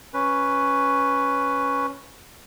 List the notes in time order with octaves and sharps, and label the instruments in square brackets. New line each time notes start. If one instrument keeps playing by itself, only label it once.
[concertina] C#4 B4